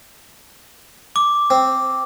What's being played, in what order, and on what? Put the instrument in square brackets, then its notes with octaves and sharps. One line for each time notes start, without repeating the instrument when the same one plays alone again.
[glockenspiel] D6
[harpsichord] C4